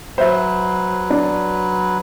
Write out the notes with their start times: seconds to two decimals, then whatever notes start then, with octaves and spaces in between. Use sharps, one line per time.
0.18 F#3 B4 C5 E5
1.10 D4